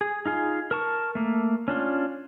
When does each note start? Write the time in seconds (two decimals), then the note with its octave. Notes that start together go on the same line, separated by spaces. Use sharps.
0.01 G#4
0.26 D#4 F4 G#4
0.71 A#4 A5 C#6
1.15 A3 A#3
1.68 C#4 D4 F4